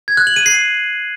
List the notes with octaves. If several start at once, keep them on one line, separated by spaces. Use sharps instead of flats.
G#6
F#6
F#7
D#7
C7